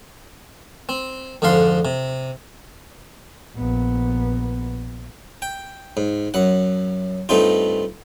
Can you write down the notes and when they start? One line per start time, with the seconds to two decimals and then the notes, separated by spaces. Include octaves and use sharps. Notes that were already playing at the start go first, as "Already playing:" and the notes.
0.89 C4
1.42 F2 G#2 D3 F5 C6
1.85 C3
3.55 A#1 B3
5.42 G5
5.97 G#2
6.34 F#2 F#5
7.29 G2 A3 C4 D#4 F4